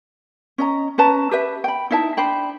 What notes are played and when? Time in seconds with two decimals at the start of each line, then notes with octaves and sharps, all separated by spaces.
0.58 C#4 D#5 A#5
0.98 C#4 B4 A5 A#5
1.31 G4 B4 E5
1.64 G5 B5
1.90 D#4 E4 E5 A5
2.17 D4 C5 G5 B5